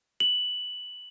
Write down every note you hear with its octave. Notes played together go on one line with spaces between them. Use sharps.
F#7